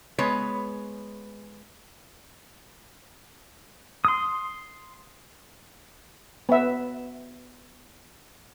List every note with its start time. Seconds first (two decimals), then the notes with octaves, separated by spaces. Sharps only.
0.18 G#3 B3 B4 C#5
4.05 C6 D#6
6.49 B3 E5